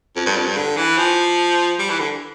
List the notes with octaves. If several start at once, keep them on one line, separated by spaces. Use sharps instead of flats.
F2
G2
F2
G2
D3
E3
F3
G3
E3
D3